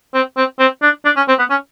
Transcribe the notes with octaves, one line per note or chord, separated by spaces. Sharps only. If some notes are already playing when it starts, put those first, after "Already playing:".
C4
C4
C4
D4
D4
C#4
C4
B3
C#4